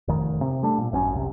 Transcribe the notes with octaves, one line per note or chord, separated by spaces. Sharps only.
F1 D#3
C3
G3 A3 D4
A#2
G#1 F#2 C4 C#4
C2 C3